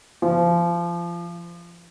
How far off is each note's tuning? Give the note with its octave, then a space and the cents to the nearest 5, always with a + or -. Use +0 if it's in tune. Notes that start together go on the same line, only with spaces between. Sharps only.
F3 -25